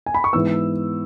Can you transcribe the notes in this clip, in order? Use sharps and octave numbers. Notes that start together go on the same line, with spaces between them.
G#5
B5
C#6
G#2 E3 B3 E6